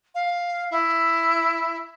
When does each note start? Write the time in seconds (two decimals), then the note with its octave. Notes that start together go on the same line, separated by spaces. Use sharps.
0.15 F5
0.71 E4